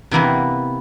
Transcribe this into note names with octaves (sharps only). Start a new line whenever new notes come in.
C3 E3 A#3 B3